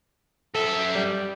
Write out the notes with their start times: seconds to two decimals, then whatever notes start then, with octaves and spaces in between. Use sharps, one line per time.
0.55 F#2 A4 E5
0.95 G3